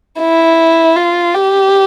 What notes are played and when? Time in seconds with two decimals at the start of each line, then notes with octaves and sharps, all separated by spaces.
0.19 E4
0.96 F4
1.35 G4